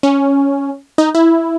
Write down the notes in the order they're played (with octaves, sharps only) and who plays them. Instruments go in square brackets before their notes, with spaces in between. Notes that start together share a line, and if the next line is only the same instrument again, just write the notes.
[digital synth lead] C#4
D#4
E4